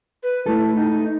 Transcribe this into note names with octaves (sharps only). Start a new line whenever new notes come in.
B4
A3 E4 A4
D#4